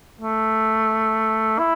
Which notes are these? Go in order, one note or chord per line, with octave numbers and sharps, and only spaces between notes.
A3
E4